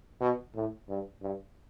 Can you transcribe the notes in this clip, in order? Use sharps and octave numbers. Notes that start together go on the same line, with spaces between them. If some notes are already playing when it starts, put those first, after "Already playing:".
B2
A2
G2
G2